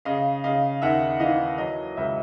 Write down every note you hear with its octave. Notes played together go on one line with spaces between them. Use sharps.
C#3 D#5 F5
C#3 D#5 F5
D#2 E5 F#5
E3 D#5 F5
F#3 D#5
C#2 E5